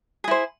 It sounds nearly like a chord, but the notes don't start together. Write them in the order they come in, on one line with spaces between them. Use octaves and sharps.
G#4 E4 C5